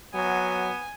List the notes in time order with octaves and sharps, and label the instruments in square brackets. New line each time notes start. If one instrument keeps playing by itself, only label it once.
[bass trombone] F#3 [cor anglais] B3 [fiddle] G#5